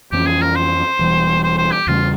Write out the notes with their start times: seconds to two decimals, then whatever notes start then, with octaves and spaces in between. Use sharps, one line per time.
0.12 F2 E3 A#3 C#4 G4
0.26 G#4
0.42 A#4
0.56 C5
0.99 E1 E2 E3 G3
1.43 C5
1.58 C5
1.71 G4
1.87 E2 C#3 G3 F4